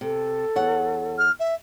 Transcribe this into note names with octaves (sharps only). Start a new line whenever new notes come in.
C3 A4
E2 C#5 F#5
F6
E5